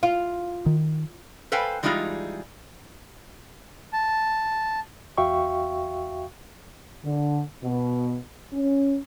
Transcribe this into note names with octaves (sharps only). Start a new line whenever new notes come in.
F4
D#3
A4 B4 C5 F5 G5 G#5
E3 G3 G#3 D#4 F4 G#4
A5
E2 F#4 E5 F5 G5 C#6
D3
B2
C#4